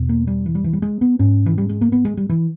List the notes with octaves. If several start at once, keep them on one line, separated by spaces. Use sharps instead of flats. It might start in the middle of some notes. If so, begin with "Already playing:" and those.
Already playing: E2 B2
A#3
G3
E3
G3
E3
G3
G#3
B3
G#2 C#4
E3
G3
G#3
A#3
B3
G#3
G3
E3